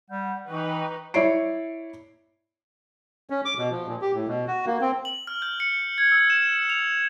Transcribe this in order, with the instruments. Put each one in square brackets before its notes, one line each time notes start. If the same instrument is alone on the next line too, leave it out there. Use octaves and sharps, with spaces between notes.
[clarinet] G3 [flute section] F#5 G6
[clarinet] E3 [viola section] D#4 B4 [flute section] G5 C#6 F#6
[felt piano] E4 C#5 D5 C7 D7
[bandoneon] C#4
D6
B2
F3
A#2
G4
A2
B2
F#4
A#3
C4
[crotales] F#7
F6
G6
C#7
G#6
E6
E7
F7